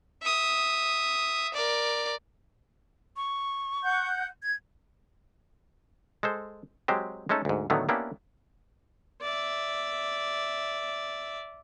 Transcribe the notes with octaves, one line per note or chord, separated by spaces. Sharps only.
E5 D#6
A#4 D5
C#6
F#5 G6
G#6
G#3 A4 C5
F#3 G#3 C4 G4 C5
G#3 A3 C#4 D#4 A4
D2 G#2
A2 D3 D#3 F#3 A3 B3
A#3 B3 C#4 D4 E4 G4
D5 E5